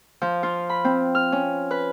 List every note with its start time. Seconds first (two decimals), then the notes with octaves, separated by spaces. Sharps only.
0.22 F3
0.43 F4
0.69 B5
0.84 C4
1.15 F6
1.32 C#4
1.71 B4